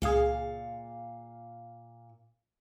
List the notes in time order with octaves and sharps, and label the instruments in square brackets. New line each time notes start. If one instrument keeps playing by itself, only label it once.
[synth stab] C#2 G#4 [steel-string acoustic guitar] A#2 F5